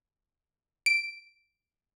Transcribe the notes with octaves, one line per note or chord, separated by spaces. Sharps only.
D7